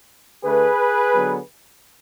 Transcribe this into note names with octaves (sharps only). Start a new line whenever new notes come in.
D3 A3 G#4 B4
D3 F#3 B3